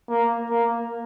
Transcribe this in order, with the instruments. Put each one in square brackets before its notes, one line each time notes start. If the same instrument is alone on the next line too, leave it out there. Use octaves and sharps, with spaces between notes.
[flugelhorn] A#3
A#3